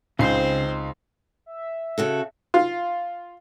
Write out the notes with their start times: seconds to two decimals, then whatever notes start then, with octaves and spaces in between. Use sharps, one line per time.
0.19 C#2 C#3 C4 D#4 C5 C7
1.46 E5
1.98 C#3 F#4 A4
2.54 F4